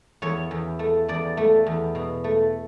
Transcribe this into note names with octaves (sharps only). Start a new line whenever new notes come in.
E2 C#5
E2
A3
E2 D5
A3
E2
B2
A3